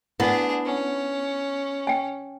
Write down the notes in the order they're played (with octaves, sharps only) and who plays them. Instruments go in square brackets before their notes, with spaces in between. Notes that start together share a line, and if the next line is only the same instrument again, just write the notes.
[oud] B3 [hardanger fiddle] D4 G#4 [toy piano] E4
[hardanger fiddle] C#4
[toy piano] G5 G#5